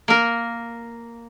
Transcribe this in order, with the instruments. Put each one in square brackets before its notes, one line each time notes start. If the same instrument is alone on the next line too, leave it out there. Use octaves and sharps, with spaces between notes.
[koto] A#3 A#4